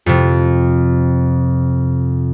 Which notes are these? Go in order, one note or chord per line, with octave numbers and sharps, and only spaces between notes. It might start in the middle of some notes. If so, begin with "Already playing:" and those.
F2 C3